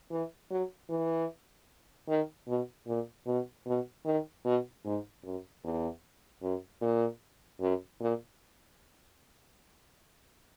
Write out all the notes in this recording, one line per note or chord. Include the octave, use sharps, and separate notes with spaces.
E3
F#3
E3
D#3
B2
A#2
B2
B2
D#3
B2
G#2
F#2
E2
F#2
A#2
F#2
A#2